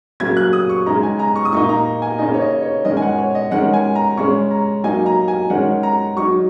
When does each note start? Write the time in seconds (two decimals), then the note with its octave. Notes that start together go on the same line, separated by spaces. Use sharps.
0.20 C#3 F#3 A#3 G#6
0.37 F#6
0.53 D#6
0.69 C#6
0.86 C#3 G#3 D#4 A#5
1.03 G#5
1.19 A#5
1.36 C#6
1.45 D#6
1.52 A#2 A#3 D#4 C#6
1.69 A#5
2.02 G#5
2.19 C#3 A#3 D#4 D#5
2.34 C#5
2.41 D#5
2.62 C#5
2.85 D#3 G#3 C#4 D#5
2.97 G#5
3.02 F#5
3.18 C#5
3.35 D#5
3.51 D#3 G#3 C#4 F#5
3.73 G#5
3.95 A#5
4.17 C#3 G#3 C#4 C#6
4.51 A#5
4.84 F#3 A#3 D#4 G#5
5.06 A#5
5.28 G#5
5.50 D#3 G#3 C#4 F#5
5.83 A#5
6.16 F#3 D#4 C#6